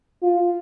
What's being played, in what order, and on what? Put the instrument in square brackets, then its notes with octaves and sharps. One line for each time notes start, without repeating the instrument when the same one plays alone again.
[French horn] F4